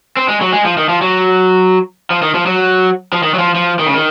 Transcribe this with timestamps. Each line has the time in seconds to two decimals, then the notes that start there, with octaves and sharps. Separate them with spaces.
0.17 C4
0.28 G#3
0.41 F#3
0.53 G#3
0.65 F3
0.77 D#3
0.89 F3
1.02 F#3
2.10 F3
2.22 D#3
2.35 F3
2.46 F#3
3.13 F3
3.23 D#3
3.34 F#3
3.39 F3
3.55 F3
3.79 D#3
3.87 C#3
3.94 D#3